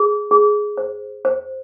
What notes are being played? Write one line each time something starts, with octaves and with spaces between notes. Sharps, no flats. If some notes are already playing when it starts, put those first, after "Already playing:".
Already playing: G#4
G#4
C5
C5